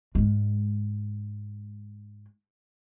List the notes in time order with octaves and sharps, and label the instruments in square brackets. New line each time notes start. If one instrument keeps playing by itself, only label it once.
[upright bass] G#2 G#3